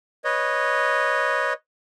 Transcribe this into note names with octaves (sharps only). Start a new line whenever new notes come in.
B4 C#5 D#5